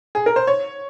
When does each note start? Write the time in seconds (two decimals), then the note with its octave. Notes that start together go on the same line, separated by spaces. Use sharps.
0.15 G#4
0.26 A#4
0.36 C5
0.47 C#5